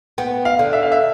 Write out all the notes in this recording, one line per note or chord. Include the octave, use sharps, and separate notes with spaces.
B3 G5
F5
D3
E5
F5
E5